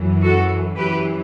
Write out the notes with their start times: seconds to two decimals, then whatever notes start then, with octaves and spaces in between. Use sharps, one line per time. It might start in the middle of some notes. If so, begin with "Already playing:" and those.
Already playing: F#2 E3
0.22 F#4 A4
0.76 F#2 E3 G4 B4